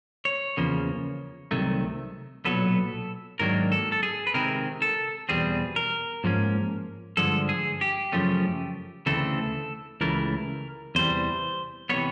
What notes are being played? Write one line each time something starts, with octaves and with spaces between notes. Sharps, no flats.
C#5
E2 C#3 F3 A#3
C2 C3 D#3 F#3 A3
B1 A#2 F#3 B3 A4
G#2 D#3 F#3 A#3 D4 A#4
A4
A4
G#4
B4
C3 D#3 G#3 C4 A#4
A4
E2 B2 G3 C4 G#4
A#4
G#2 F3 A#3 C#4
G2 D3 F3 G#3 A4
G#4
G4
F#2 C#3 F3 A3 C#4
D2 C#3 E3 A3 C4 A4
C#2 C#3 E3 A3 A#4
E2 C3 E3 G3 C5
C3 E3 G#3 B3 C#5